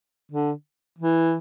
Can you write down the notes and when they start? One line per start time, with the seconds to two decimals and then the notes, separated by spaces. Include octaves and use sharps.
0.32 D3
0.99 E3